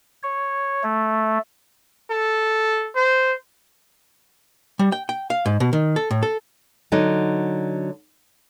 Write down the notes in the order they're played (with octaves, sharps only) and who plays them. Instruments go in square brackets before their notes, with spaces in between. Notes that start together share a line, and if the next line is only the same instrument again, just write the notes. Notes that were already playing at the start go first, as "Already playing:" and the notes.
[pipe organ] C#5
A3
[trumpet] A4
C5
[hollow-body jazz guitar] G3
G5
G5
F5
G#2
B2
D#3
A4
A2
A4
[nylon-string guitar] D3 F#3 D#4